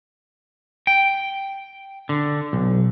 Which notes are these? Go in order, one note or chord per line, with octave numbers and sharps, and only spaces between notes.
G5
D3
B1